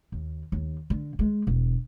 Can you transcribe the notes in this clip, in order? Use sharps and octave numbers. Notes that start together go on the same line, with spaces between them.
D#2
D#2
D3
G#3
E1